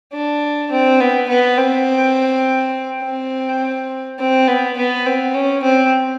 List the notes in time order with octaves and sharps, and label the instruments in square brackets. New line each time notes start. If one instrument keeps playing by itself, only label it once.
[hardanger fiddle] D4
C4
B3
B3
C4
C4
C4
B3
B3
C4
C#4
C4